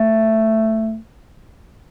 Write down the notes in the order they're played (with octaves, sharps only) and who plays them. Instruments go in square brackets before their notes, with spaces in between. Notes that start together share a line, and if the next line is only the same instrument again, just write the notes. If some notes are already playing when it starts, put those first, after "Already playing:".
Already playing: [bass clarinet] A3